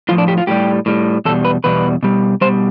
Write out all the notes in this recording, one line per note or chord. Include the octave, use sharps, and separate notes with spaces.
A2 F3 F4
D4
G4
F4
A2 G3 G4
A2 G3
E2 B2 G3 A4
B4
E2 B2 G3 B4
B2 G3
B2 G3 C5